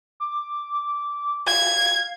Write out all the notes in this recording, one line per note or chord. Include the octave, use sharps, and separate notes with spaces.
D6
F5 G#6